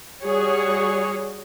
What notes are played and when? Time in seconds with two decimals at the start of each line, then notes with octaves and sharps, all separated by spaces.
0.24 G3 F#4 G#4 C#5